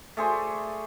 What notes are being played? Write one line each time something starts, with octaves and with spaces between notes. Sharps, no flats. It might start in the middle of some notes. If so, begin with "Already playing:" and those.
A3 G#4 C5 D5